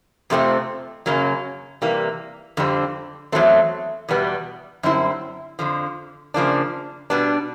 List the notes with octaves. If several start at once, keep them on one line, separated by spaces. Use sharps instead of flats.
F2 C3 F3 A3 C4
F#2 C#3 F#3 A#3 C#4
C3 E3 G3 A#3
F2 D3 G3 C4
E2 B2 F#3 A3 C4
E2 B2 G3 B3
F#2 D3 G3 C4 E4
F2 D3 F3
C#3 F3 A#3 D4
B2 G3 B3 D4